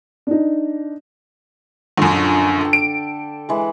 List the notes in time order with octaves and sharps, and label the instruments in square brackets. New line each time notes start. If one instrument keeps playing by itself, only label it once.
[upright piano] D4 D#4
[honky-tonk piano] A#1 F#2 [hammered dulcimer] D3
[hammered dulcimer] A4 G5
[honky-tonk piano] D7
[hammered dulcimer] E3 G#3